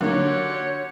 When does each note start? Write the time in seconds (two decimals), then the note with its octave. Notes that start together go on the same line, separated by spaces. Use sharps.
0.01 D3 F#3 A#3 D#4 F#4 G4 C#5